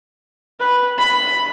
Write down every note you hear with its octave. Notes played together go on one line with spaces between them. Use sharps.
B4
B5